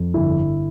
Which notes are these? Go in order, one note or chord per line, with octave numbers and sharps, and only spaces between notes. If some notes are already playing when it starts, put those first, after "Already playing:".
Already playing: F2
G1 E4